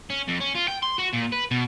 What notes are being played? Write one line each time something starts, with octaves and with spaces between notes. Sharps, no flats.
C#4
F2
C#4
F4
G5
C6
F#4
A#2
B4
B2